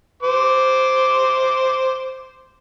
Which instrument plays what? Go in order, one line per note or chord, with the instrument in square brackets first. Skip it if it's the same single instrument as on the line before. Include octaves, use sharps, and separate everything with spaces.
[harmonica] C5 D6